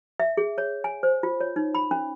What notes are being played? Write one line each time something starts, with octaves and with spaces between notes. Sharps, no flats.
E5
G#4
C#5
G#5
C5
F4
C#5
D#4
B5
C#4